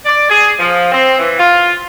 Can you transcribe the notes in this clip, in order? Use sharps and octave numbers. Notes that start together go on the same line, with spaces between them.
D5
G#4
F3
C4
E3
F4